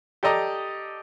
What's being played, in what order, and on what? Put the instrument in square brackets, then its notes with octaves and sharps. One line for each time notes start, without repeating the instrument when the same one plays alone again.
[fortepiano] G4 A4 D5 D#5 A#5